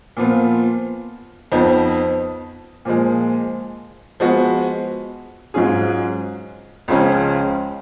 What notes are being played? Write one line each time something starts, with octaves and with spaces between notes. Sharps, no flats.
A#2 F3 B3 F4
F2 F3 B3 D#4
A#2 F3 G#3
F3 G#3 B3 F#4
G#2 F#3 C#4 F4 G#4
C#2 C#3 F3 G#3 C#4